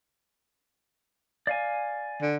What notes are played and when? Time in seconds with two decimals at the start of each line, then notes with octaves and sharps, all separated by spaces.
1.47 D5 F5 G#5
2.21 D3